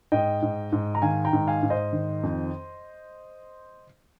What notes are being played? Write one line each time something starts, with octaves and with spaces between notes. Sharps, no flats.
G#2 D#5 G5
G#2
G#2
A#5
D#3 F5 G#5
G5 A#5
G#2
F5 G#5
G#2
C5 D#5
D#3
F2